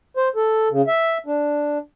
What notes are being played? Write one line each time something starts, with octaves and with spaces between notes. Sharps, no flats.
C5
A4
C#3
E5
D4